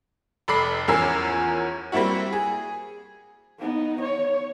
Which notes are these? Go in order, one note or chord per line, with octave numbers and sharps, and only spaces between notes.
F1 A4 B5 D6 C7
E2 F3 C#4 A#4 E6 C7
G3 A#3 C4 E4 F#4
G#4
B3 D#4
C#5